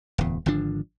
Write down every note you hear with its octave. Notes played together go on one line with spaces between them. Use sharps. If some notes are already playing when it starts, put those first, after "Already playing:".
D1 E2
G#1 D3 F3 D4